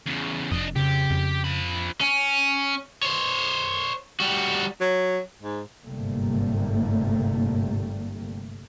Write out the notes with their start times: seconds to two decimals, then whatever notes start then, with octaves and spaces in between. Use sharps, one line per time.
0.06 E2 C#3
0.52 F1 F2 D4 D#5
0.76 C#3 G4
1.10 F2
1.44 F3 B5
2.01 C#4
3.03 C5 C#5
4.20 G3 F#4
4.81 F#3
5.42 G#2
5.84 G1 G#2 C3 G3 A3 A#3